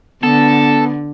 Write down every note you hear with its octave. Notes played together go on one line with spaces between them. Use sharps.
D3 B3 A4